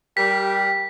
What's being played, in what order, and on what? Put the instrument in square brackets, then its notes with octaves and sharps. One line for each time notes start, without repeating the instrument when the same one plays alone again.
[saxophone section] G3 A#4 [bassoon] G4 [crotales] B6